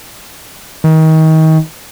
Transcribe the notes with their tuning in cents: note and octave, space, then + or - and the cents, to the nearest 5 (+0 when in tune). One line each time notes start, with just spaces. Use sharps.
D#3 +30